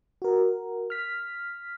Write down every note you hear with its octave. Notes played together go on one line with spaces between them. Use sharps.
F#4 A#4
F6 B6